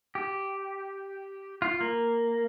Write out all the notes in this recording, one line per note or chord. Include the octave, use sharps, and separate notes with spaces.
G4
F4
A#3